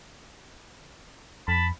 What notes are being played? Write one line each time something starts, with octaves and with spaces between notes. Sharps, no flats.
F2 A5 B5